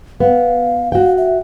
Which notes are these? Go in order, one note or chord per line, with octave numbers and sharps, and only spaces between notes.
B3 F5
F#4 F5 G5
E5